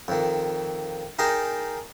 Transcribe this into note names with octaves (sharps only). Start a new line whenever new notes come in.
F2 D#3
D#4 G#4 A#4 G5 A5 A#5